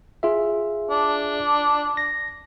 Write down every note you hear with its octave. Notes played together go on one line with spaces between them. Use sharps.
F4 G#4 E5
D4
A#6